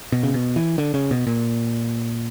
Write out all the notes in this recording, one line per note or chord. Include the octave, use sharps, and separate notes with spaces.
B2
C#3
B2
E3
D3
C#3
B2
A#2